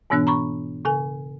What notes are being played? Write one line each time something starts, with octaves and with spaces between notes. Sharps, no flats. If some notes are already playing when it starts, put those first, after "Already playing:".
G#2 B2 E3 B3 D4 F#6
A#5 B5 C#6
C#3 A4 G#5